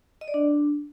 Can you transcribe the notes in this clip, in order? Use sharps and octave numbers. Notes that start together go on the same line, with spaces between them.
D#5
D5
D4